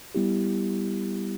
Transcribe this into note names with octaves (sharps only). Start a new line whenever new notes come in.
G3 B3 E4 G4